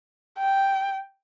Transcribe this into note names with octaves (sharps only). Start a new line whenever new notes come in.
G5